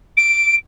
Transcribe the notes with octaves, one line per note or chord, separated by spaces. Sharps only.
D7